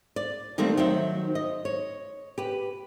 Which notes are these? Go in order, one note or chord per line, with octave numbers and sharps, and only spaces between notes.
D5
D#3 G3 A3 A#3 C4 D4
D#3 F#3 C5 E5
D#5
C#5
G4 B4